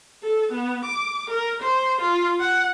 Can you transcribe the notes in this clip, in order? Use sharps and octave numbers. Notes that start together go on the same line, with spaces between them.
A4
B3
D6
A#4
C5
F4
F#5